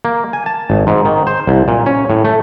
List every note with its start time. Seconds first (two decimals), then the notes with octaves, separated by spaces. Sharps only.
0.05 A#3
0.33 G#5
0.46 A5
0.70 G#1
0.87 G#2
1.05 D#3
1.27 C5
1.47 C2
1.68 A#2
1.86 C#4
2.10 A2
2.25 A3